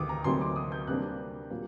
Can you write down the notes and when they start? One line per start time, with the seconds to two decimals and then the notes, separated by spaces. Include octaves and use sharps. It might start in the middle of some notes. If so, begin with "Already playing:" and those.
Already playing: D2 C3 D#3 D6 D#6
0.09 A#5
0.24 D2 C3 F#3 A#3 D#4 C6
0.41 D6
0.56 D#6
0.72 G6
0.87 C3 G3 A#3 D4 F#6
1.51 A#2 F#3 A#3